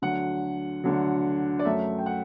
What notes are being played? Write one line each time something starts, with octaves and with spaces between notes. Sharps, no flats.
D2 D3 F#3 F#5
D2 D3 F#3
D5
F#2 F#3 A3 E5
G5
F#5